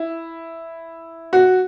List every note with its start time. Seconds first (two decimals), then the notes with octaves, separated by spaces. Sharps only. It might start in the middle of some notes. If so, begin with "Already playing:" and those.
Already playing: E4
1.33 F#4